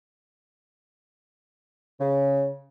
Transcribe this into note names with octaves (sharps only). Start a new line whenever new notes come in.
C#3